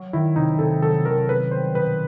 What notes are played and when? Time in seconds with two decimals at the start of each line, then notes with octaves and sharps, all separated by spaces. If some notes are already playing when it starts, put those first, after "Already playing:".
Already playing: F#3
0.13 D#3 E4
0.36 C3 D#4
0.59 C3 A4
0.82 F#3 A4
1.05 D#3 A#4
1.29 B3 B4
1.51 G3 C5
1.75 B2 B4